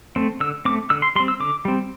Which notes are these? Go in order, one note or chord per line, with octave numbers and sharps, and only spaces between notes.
A3 C4
D3 E6
A3 C4 D6
D3 E6
C6
G3 C4 C6
E6
D3 D6
G3 C4